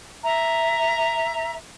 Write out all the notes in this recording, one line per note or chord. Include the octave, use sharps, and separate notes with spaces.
E5 A#5